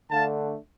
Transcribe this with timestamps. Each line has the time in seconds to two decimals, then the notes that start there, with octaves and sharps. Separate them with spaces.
0.10 D3 A3 D4 F5 A5